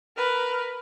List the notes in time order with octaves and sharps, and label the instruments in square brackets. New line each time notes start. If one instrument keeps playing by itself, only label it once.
[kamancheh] A#4 B4